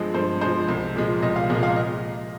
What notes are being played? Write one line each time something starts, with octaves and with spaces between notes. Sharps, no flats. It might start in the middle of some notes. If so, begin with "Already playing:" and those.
Already playing: G2 F3 G#3
G2 C5
F3 G#3 C5
C2
A#2 F3 G#3
C2 D#5
F5
A#2 F3 G#3 D#5
F5
D#5